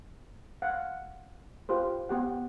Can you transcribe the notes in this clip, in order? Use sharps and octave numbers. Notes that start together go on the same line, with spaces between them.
F5 F#5
F4 G4 B4 C5
B3 G4 F#5